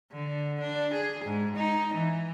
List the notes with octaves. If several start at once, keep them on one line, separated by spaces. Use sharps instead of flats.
D3
D4
G#4
G#2
D#4
E3